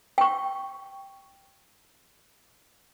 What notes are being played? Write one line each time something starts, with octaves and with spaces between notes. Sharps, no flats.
G5 C#6